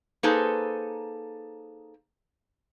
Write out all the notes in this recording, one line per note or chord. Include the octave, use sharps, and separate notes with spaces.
A#3 D#4 G#4 A4 B4 C5